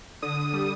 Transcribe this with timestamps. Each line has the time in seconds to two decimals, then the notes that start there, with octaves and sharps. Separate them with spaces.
0.22 D3 D#6
0.53 G3